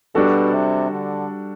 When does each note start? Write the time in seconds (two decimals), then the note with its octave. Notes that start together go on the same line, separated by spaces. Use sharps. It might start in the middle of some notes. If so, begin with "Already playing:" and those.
0.15 B2 G3 D4 F#4 A4
0.53 C3
0.91 D3